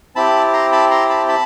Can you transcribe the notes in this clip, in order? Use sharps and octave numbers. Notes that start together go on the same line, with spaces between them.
C4 E4 G4 A5 B5
A#5 C6
A5 B5
A#5 C6
A5 B5
A5 B5